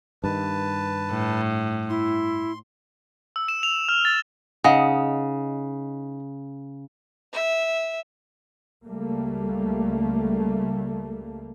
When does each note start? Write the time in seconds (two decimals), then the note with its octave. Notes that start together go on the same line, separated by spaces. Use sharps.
0.24 G2 D#3 B4 A5
1.10 A2
1.89 E4 C6
3.36 E6
3.48 E7
3.63 F7
3.89 F6
4.05 A6
4.64 C#3 D#4 D#5 F#5
7.32 E5
8.85 C#2 G3 A3 A#3